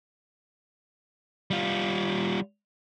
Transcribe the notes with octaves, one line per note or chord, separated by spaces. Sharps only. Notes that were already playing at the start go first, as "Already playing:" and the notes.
G3 F4